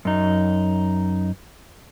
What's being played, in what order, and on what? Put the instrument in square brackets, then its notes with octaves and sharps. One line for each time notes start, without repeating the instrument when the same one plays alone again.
[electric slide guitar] F#2 D#4